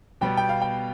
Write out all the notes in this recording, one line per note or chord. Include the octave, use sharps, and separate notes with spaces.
B2 G3 B3 G5
G5
F5
G5